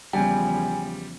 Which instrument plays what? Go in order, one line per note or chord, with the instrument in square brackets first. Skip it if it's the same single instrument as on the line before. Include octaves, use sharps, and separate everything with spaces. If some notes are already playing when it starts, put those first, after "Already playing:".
[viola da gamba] E2 C#3 F3 [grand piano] G3 [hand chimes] G5 G#5